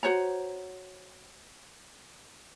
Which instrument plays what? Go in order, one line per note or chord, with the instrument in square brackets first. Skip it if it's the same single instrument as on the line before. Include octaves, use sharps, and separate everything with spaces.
[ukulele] F#4 C5 C#5 A#5